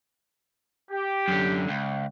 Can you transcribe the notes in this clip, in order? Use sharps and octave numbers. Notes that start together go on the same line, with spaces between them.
G4
F#2 D3
C#2